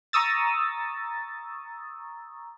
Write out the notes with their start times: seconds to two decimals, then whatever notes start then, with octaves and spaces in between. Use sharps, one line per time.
0.13 A#5 C#6 D#6 E6 A6